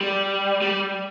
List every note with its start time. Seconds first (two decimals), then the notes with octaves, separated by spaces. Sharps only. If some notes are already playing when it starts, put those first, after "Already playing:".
0.01 G3
0.62 G3